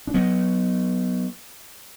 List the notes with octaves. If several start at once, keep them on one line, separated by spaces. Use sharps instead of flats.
D4
F#3 B3